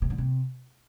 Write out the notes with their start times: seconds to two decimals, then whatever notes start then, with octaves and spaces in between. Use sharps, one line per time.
0.02 C3
0.10 D3
0.18 C3